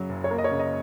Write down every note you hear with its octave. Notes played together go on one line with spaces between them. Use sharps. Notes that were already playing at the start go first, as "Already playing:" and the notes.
Already playing: F#2 C#3 F#3
F#1
C#5
A#3 A#4
D#5
C#5
C#3
D#5